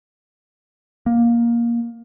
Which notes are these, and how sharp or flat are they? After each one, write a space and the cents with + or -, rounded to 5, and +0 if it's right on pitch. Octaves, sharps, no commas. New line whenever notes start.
A#3 +15